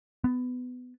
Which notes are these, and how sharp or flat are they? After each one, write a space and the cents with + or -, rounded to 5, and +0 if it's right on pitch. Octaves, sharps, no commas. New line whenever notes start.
B3 +20